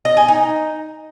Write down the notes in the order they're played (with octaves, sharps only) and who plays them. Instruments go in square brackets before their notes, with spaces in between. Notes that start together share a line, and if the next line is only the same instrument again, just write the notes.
[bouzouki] D#5
G#4
D#4